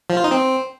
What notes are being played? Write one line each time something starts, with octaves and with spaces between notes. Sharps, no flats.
F3
F4
D#4
C4